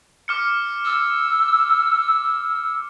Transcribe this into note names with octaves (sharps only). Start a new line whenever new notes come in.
D6 F6 C#7
E6